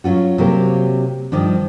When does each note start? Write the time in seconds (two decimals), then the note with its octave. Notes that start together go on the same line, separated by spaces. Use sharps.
0.04 F#3 C#4 F4 F#4
0.38 C3 F#3 A#3 A#4
1.32 G2 D#3 F3 D4